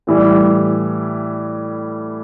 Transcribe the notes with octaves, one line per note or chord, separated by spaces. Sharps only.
A2 E3 G3